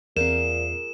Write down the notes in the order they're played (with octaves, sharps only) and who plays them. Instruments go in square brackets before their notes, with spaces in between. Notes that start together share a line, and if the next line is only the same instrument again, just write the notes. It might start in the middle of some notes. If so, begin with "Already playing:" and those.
[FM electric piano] E2 C4 [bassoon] A#2 [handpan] F4 G#4 A#4 [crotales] E7